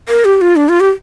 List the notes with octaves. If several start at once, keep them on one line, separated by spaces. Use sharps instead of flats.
A#4
G4
F4
D4
F4
G4